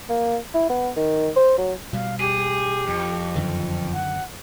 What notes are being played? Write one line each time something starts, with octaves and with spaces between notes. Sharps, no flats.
A#3
E4
B3
D#3
C5
F#3
B2 G3 F5
G4 G#4
F2
F#2 D3 D#3
F#5